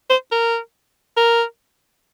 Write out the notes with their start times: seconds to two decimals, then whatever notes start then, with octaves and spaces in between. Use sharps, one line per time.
0.10 C5
0.32 A#4
1.17 A#4